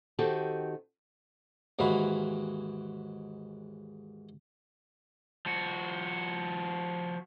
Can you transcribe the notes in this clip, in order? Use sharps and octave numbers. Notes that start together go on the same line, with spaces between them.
D#3 C4 F#4 G4 A4
D#2 G#2 E3 F#4 F5 B5
F3 F#4